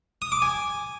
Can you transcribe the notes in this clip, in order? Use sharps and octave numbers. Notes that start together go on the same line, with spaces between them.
D#6
D6
G#5